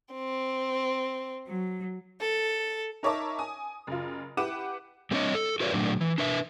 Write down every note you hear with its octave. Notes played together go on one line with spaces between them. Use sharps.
C4
F#3
A4
D#4 A#4 C#5 E5 A5 D6
G#5 D#6
F#1 F4
E4 G4 B4 F#5 D6 E7
G3 A3 C4 D4 C#5 D#5
A4
F#4 A#4 B4 C#5 D5
A#2 F#3 A3 D4
E3
D4 B4 E5